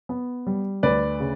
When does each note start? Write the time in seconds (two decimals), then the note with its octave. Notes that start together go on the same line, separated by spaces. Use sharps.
0.09 B3
0.47 G3
0.83 D2 B4 D5
1.20 C#3